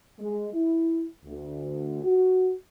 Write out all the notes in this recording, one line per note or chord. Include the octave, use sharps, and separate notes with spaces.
G#3
E4
D2
F#4